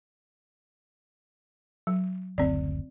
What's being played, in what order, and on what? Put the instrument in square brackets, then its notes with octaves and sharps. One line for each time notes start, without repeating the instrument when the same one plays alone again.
[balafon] F#3
[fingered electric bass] F#1 D2 [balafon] C4 D5